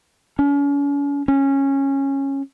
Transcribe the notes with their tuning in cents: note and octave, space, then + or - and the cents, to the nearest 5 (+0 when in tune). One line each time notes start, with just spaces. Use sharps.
C#4 +40
C#4 -15